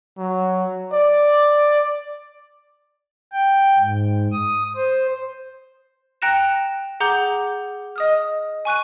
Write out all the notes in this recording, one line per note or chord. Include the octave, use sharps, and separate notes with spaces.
F#3
D5
G5
G#2
D#6
C5
G5 A#5 F#6 A#6 C#7 E7
G#4 F#5 A#5 D6 G6 G7
D#5 D#6 F6
G#5 C#6 F#6 D#7